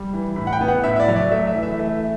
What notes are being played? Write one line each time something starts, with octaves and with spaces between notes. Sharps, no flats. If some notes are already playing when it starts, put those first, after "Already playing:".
Already playing: G3
E3
A2 B5
F#5
G5
B3
F#5
A2 E5
E5
D5
F#3
D5
A3 E5
E5
E3
E5
A3 E5